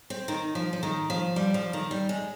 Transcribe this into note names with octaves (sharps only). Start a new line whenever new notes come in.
C4
D#3
F3
F3
D#3
F3
G3
F3
D#3
G3
G#3